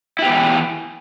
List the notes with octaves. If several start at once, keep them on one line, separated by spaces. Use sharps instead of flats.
E3 B3 E4 G4